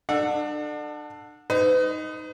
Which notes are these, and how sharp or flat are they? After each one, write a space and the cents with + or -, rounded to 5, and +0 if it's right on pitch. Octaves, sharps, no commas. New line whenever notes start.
D4 +35 A4 +10 F#5 -20
D#4 +0 B4 +45